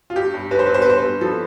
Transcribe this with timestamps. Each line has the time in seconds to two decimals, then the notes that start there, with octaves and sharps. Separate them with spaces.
0.10 F4
0.16 G2 G4
0.34 G2
0.51 G2 B4
0.59 C5
0.66 B4
0.69 G2
0.74 C5
0.82 B4
0.86 G2 C5
0.98 B4
1.04 G2
1.21 F3 A4